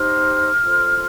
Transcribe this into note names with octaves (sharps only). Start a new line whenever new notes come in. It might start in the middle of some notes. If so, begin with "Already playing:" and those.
Already playing: D#4 G4 C5 F6
F4 A4 C5